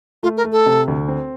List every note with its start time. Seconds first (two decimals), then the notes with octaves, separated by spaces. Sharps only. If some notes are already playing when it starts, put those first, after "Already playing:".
0.23 A3 F4
0.37 A#4
0.44 A3
0.52 A4
0.66 C3
0.88 D2
1.08 C4